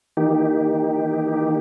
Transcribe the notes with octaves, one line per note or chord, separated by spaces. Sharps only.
D#3 E3 A#3 D#4 G4